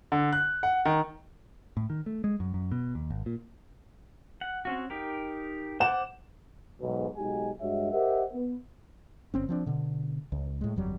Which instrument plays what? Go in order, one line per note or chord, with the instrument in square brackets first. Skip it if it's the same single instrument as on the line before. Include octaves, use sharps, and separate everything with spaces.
[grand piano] D3
F#6
F#5
D#3
[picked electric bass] A2
D#3
A3
G#3
F#2
F#2
B2
D#2
G#1
A#2
[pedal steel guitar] F#5
C4 C#4 F#4
D#4 G4 A#4
[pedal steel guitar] C5 D5 D6 [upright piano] F#5 E7
[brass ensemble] B1 G#2 B2
B1 G#3 D#4 F#4 G4 G#5
G2 G#3 F#4 C#5 E5
G4 A#4 C5 D#5 E5 F#5
B3
[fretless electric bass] G1 C4 C#4
F3 C4 D4
B2 D3
C#2
A2 G#3
G1 F2 F#3 G3